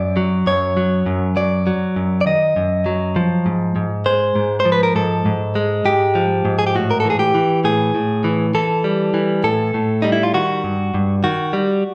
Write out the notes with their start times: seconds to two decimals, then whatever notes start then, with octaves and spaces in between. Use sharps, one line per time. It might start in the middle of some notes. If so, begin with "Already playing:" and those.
Already playing: F#2 D5
0.17 F#3
0.47 F#2 C#5
0.77 F#3
1.06 F#2
1.36 F#3 D5
1.67 F#3
1.96 F#2
2.21 D5
2.26 D#3 D#5
2.56 F#2
2.86 F#3
3.16 F3
3.46 G#2
3.76 G#2
4.06 G#3 C5
4.36 G#2
4.60 C5
4.65 F3
4.72 B4
4.83 A#4
4.95 G#2 A4
5.25 G#2
5.55 G#3
5.85 G#2 G4
6.15 F3
6.45 G#2
6.59 G#4
6.67 G4
6.75 A2 F#4
6.91 A#4
7.00 A4
7.05 E3 G#4
7.19 G4
7.34 E3
7.64 A2 G#4
7.95 A2
8.24 E3
8.55 E3 A4
8.84 G3
9.14 E3
9.44 A2 A4
9.74 A2
10.02 G3 D#4
10.12 E4
10.23 F4
10.34 D#3 F#4
10.64 G2
10.94 G2
11.24 D#3 F#4
11.53 G3